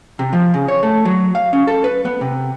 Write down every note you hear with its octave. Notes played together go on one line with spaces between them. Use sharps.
C3
F3
C#3
C#5
A3
F#3
F5
C#4
A4
B4
B3
C3